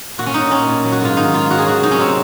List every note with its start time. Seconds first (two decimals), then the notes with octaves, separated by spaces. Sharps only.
0.18 A#2 F#4
0.26 C#4
0.34 A#2 D#4
0.51 A#2 C#4
0.68 A#2
0.85 F#3
0.92 F#4
1.01 G#2 F4
1.17 D#3 D#4
1.33 G#2 F4
1.50 F#3 F#4
1.58 G#4
1.67 F#3 F#4
1.83 C3 D#4
1.91 C#4
2.00 F#3 C4